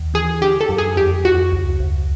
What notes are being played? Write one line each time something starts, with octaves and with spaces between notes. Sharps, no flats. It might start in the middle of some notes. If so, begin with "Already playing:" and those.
Already playing: D#2
E3 G#4
D3 G4
A4
F#2
G#4
F2 G4
F2 F#4
C#2
C#2